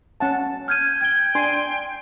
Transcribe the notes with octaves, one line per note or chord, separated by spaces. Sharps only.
C#4 F#5 A5
F6 G6 G#6 D#7
G5 G#6 G7
D4 G#5 C6